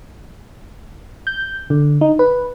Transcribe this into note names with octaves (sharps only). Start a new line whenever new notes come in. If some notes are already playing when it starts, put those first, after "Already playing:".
G6
D3
D#4
B4